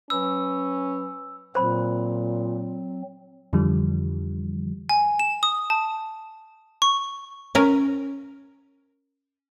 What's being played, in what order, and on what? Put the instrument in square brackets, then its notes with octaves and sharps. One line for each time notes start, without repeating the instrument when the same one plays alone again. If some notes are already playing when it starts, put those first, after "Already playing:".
[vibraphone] F#3 B4 B5 [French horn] C#4 [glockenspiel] E6
[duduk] A#2 [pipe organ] F#3 C4 [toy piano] C5 B5
[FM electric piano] F2 D3 E3 F3 G3
[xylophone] G#5
E7
D#6
A5
C#6
[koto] C#4 A#4